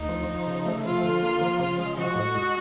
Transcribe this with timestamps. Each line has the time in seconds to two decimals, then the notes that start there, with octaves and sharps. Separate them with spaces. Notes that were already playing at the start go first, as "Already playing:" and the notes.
Already playing: D2 D#4
0.09 F3
0.28 F3
0.47 C#3
0.65 A3
0.84 F3 F4
1.03 D3
1.22 A#3
1.41 F3
1.59 C#3
1.79 G#3
1.97 F3 F#4
2.16 A2
2.35 G#3